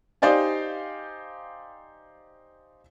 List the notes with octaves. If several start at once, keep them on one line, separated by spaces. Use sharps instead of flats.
D#4 G4 C5 D5 F5 G#5